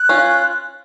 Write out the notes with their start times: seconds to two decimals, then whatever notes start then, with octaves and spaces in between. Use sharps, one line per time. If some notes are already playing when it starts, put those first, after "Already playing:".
Already playing: F#6
0.09 C#4 F4